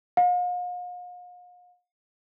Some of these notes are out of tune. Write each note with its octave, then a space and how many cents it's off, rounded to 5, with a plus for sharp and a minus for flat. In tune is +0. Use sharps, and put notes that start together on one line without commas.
F5 +45